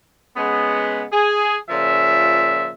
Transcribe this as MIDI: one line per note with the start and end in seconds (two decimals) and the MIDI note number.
0.37 1.04 49
0.37 1.04 56
0.37 1.04 59
1.12 1.56 68
1.70 2.71 46
1.70 2.71 49
1.70 2.71 53
1.70 2.71 76